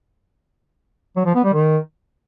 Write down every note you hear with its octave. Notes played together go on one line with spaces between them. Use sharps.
F#3
F3
B3
G3
D#3